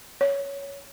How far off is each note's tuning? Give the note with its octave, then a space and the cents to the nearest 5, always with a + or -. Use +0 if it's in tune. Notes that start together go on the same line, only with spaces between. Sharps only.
C#5 +10